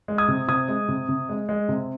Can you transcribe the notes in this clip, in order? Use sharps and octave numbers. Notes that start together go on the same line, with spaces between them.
G#3
D#6 G#6
C3
C3 D#6 G#6
G#3
C3
C3
G#3
G#3
C3